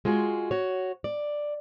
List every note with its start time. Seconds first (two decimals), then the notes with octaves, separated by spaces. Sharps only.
0.05 G#3 F4 F#4 G#4
0.51 F#4 C#5
1.04 D5